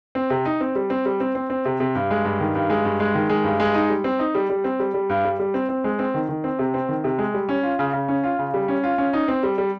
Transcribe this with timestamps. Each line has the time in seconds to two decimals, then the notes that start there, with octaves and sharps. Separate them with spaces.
0.15 C4
0.30 C3
0.45 D#4
0.60 C4
0.75 G3
0.90 C4
1.05 G3
1.20 C4
1.35 C4
1.50 C4
1.65 C3
1.80 C3
1.95 G2
2.10 G#3
2.25 G2
2.40 D#3
2.55 G2
2.70 G#3
2.84 G2
3.00 G#3
3.15 D#3
3.29 G#3
3.44 G2
3.60 G#3
3.74 D#4
3.90 G3
4.04 C4
4.19 D#4
4.35 G3
4.50 G3
4.64 C4
4.79 G3
4.94 G3
5.10 G2
5.24 G3
5.39 G3
5.54 C4
5.69 C4
5.84 G#3
5.99 C4
6.14 D#3
6.29 D#3
6.44 C4
6.59 C3
6.74 C4
6.89 D#3
7.04 C3
7.18 G#3
7.34 G3
7.49 C#4
7.63 F4
7.79 C#3
7.93 C#3
8.08 C#4
8.24 F4
8.39 C#3
8.54 G3
8.68 C#4
8.84 F4
8.98 C#4
9.13 D#4
9.28 C4
9.43 G3
9.58 G3